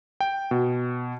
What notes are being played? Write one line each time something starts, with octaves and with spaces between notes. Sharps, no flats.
G5
B2